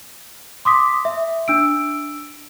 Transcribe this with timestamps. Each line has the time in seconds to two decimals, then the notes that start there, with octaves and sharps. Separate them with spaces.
0.65 C6 D6 D#6 B6
1.05 E5
1.48 D4 E6 D7